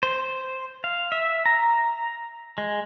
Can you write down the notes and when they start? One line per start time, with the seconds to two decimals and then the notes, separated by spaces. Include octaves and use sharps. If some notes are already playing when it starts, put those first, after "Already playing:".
0.03 C5
0.84 F5
1.12 E5
1.46 A#5
2.58 G#3